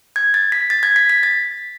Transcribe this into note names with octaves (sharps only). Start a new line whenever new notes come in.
G#6
A6
B6
A6
G#6
B6
B6
A6